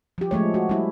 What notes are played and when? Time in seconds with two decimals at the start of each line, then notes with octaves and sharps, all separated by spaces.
0.18 F3 G4
0.31 F3 G#3 A3 C#5
0.54 F#4
0.69 G3 E4